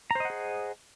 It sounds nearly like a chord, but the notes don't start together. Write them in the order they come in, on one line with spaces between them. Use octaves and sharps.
A#5 C5 D#5 F#5 G#4